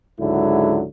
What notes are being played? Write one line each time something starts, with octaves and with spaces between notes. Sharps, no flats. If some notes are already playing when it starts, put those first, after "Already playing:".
C#2 G#2 D3 F#3 E4